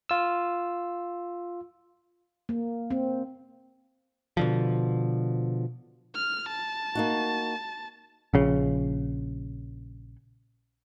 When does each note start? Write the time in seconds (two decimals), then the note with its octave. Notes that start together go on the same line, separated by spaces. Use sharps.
0.09 F4 E6
2.49 A#3
2.91 C4
4.37 B2 D3 F3
6.15 F6
6.49 A5
6.95 A#3 D#4 F#4
8.34 A#1 C#3